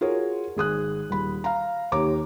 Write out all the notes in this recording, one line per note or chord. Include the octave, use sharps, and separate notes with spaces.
F4 F#4 G#4 A#4 C#5
G#1 G#4 D#6 F#6
D#1 B5
F5 A#5
D#2 G4 C#5 A#5 D6